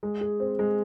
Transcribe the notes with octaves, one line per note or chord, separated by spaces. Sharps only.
G#3
G#4
C4
G#3